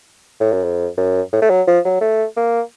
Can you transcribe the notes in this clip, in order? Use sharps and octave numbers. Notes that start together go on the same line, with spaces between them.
A2
F#2
F2
F#2
A2
A3
F#3
F3
F#3
A3
A#3